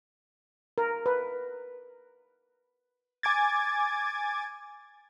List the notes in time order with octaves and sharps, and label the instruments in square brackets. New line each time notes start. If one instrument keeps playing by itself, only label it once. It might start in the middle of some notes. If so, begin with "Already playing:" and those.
[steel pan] A#4
B4
[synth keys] G#5 D6 G#6 A6